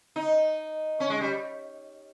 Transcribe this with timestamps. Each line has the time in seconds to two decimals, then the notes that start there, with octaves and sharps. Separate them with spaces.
0.16 D#4
1.00 C#4
1.10 G#3
1.21 G3